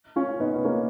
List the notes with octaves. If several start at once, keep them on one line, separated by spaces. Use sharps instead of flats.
C#4 F4
B3 D#4
B3
A#3 C#4